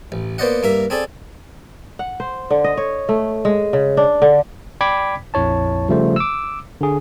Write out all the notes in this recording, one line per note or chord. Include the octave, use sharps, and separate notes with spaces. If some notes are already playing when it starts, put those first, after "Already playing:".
A1
A#3 B3 C5 D5 D#5 F#5
G2 A#3 A#4 E5
C4 G#4 A4 D5
F#5
C5
D3
D#5
C#5
A3
G#3
C#3
D4
D3
D5 G5 B5 D6 G#6 B6
A#1 F2 E4 C#5 A5
C#3 F3 G3 A3 F4 C5
D6 E6
D3 G#4